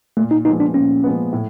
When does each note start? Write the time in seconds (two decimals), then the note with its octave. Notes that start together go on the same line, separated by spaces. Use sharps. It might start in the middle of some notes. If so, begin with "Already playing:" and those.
0.17 A#2 A3
0.31 D#4
0.45 F3 G#3 B3 D#4
0.60 D4
0.74 A#2 C#4
1.03 F3 G#3 B3
1.32 A2